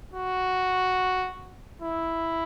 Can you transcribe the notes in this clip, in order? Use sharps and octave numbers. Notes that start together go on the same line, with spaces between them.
F#4
E4